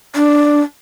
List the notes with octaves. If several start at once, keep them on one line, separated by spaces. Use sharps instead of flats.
D4